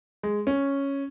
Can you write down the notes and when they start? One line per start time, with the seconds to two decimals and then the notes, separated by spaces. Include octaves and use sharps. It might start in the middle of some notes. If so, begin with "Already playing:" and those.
0.23 G#3
0.47 C#4